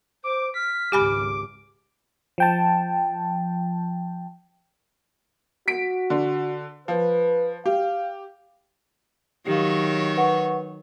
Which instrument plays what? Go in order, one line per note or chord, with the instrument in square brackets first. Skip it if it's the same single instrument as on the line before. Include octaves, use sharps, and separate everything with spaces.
[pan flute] C5 [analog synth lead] D6
[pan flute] F6 [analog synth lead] B6
[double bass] G#1 C#2 [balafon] G4 G#5 B5 [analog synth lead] D6
[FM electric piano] F3 G5 A5
[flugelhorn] F#4 [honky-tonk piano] B6 D7
[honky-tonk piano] D3
[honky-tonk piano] F3 [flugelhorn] B4
[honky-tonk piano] G4 [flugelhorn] F5
[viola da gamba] D#3 F#3 C#5 [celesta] G4 F5
[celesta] B4 F#5 C#6